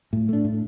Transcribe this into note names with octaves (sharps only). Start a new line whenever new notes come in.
A2
A3 D4
A2